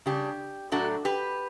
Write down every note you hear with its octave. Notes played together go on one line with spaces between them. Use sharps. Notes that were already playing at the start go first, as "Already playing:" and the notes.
C#3 G3 D4 G4
A2 F#3 A3 D4 F#4 A4
G4 B4